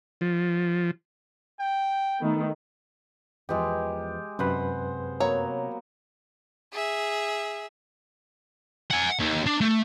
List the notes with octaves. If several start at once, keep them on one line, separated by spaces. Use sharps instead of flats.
F3
G5
D#3 A3 B3
E2 F3 G#3 G4 B4
F#2 C3 B4 C5 F#5 B5
F#3 A#3 B3 C#5 A#5
G#4 E5
F#5 G#5
D#2
D4
A3